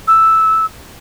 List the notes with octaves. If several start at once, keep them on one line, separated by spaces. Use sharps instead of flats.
E6